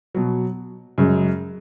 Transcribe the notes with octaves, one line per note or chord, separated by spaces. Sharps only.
B2 F#3
F#2 C#3 G#3